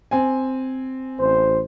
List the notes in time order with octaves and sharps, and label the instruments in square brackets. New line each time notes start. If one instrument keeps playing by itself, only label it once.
[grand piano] C4 G#5
[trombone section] A1 C5